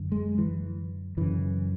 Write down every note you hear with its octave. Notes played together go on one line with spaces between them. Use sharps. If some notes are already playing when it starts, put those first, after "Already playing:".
Already playing: F#2 D3
G#3
E3
F#2 C#3 E3